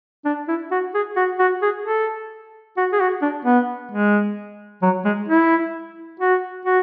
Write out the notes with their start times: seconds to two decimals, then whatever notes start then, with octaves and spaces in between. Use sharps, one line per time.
0.25 D4
0.48 E4
0.71 F#4
0.95 G#4
1.17 F#4
1.39 F#4
1.62 G#4
1.85 A4
2.78 F#4
2.93 G#4
3.00 F#4
3.22 D4
3.45 B3
3.92 G#3
4.83 F#3
5.05 G#3
5.28 E4
6.20 F#4
6.66 F#4